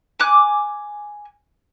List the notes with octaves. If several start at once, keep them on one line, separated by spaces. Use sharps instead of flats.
G#5 D6 F#6